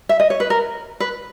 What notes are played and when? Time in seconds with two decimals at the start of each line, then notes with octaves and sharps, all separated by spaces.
0.09 E5
0.20 D#5
0.30 C#5
0.40 B4
0.50 A#4
1.00 B4